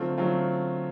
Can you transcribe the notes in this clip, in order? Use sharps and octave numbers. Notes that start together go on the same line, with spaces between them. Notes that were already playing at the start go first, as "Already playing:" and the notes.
Already playing: D3 F#3 A3 C4 F4
D3 F#3 A3 C4 F4